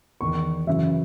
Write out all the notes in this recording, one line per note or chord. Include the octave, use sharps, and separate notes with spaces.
E2 D#3 C#6
F#2 C#3 E3 E5